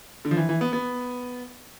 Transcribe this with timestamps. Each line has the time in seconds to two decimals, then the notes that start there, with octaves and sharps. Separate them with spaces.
0.25 D3
0.31 F3
0.37 E3
0.49 E3
0.61 B3
0.73 B3